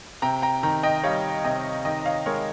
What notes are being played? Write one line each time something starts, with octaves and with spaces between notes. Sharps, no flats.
C3 G5 A#5
G5 A#5
D#3 G5 A#5
D#5 G5
G3 C#5 F5
C3 D#5 G5
D#3 D#5 G5
C#5 F5
G#3 A#4 C#5